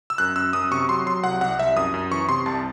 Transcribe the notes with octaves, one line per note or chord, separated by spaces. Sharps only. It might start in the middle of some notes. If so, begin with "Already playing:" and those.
E6
F#2 F#6
F#2 E6
F#2 D#6
C3 C#6
F#3 C6
F#3 C6
C2 F#5
C2 F#5
C2 E5
F#2 D#6
F#2
E3 C#6
C3 C6
C2 A5